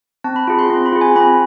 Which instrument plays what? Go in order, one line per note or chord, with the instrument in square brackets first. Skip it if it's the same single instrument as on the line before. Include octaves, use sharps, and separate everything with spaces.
[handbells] C4 A5
B5
F4 G#4 B5
C6
C4 C6
B5
F4 G#4
G#5
C4 B5